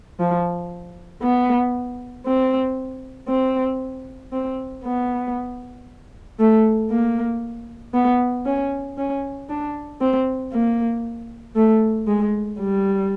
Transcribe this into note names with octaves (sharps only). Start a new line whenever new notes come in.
F3
B3
C4
C4
C4
B3
A3
A#3
B3
C#4
C#4
D4
C4
A#3
A3
G#3
G3